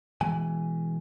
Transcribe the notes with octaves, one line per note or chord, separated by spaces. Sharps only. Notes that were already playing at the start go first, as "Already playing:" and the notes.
B2 E3 G#3 G#5